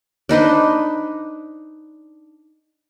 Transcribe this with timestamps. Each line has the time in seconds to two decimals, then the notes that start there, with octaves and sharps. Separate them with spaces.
0.29 D4 D#4 B4 C5